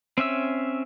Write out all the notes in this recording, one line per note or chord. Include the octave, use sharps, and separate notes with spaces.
C4 C#4 E5 E6